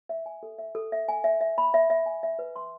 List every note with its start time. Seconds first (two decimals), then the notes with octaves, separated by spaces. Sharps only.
0.09 E5
0.26 G#5
0.43 A4
0.59 E5
0.75 A4
0.92 E5
1.08 G#5
1.24 E5
1.41 E5
1.58 B5
1.74 E5
1.90 E5
2.06 G#5
2.23 E5
2.39 B4
2.56 C6